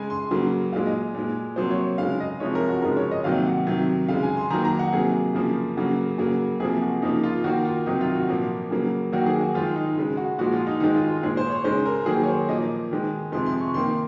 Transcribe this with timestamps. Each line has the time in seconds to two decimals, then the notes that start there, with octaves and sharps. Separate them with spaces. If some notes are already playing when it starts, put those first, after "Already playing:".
Already playing: C#3 G#3 G#5
0.10 C6
0.31 C#3 F#3 A#3
0.73 A#2 G#3 F5
0.86 D#5
1.15 A#2 G#3
1.56 C3 F#3 A#3 C5
1.71 C#5
1.98 C#3 G#3 F5
2.20 D#5
2.40 C3 F3 G#3 C#5
2.55 A#4
2.69 F#4
2.82 C#3 F3 G#3 A#4
2.97 C#5
3.11 D#5
3.24 C3 D#3 F#3 A#3 F5
3.46 F#5
3.67 C3 D#3 F#3
4.08 C#3 G#3 F5
4.23 G#5
4.37 C6
4.50 D#3 F#3 A#3 A#5
4.65 A#5
4.79 F#5
4.93 C3 F#3 A#3 G#4
5.35 C#3 F3 A#3
5.77 C#3 F#3 A#3 F#4
6.18 C#3 F#3 A#3
6.60 C3 F3 A#3 G#4
6.82 F#4
7.02 C#3 F3 A#3 D#4
7.24 F4
7.44 D#3 A#3 F#4
7.65 F4
7.86 C3 D#3 F#3 D#4
8.01 F4
8.15 F#4
8.29 A#2 F3 A#3
8.71 C#3 F#3 A#3
9.12 D#3 F#3 A#3 F#4
9.26 G#4
9.40 F#4
9.54 D#3 G#3 F4
9.76 D#4
9.97 C#3 G#3
10.17 F#4
10.38 A#2 F3 G#3 F#4
10.53 F4
10.67 D#4
10.80 D#3 G#3 D#4
10.95 F4
11.08 F4
11.23 A#2 G#3 G#4
11.37 C5
11.50 C#5
11.64 C#3 G#3 C5
11.86 A#4
12.06 D#3 F#3 A#3 G#4
12.23 C#5
12.28 C5
12.48 A#2 F3 A#3 D#5
12.91 D#3 G#3
13.32 C3 F3 G#3 C6
13.46 C6
13.61 C#6
13.74 D#3 A#3 C6